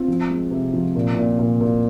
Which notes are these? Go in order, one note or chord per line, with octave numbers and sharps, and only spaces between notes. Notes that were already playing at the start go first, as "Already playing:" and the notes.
Already playing: C4 F4
F3
G#3
C3
F3
A#2
A#2
A#2
A#2